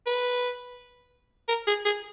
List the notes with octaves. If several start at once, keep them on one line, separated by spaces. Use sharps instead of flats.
B4
A#4
G#4
G#4